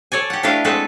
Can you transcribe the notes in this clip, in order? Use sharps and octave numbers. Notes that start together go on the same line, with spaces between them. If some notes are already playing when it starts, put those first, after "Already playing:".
A4 C#5 D5 G#5
G4 F#5
A3 D4 E4 G4 B4 F5
G#3 A3 C4 A4 B4 F#5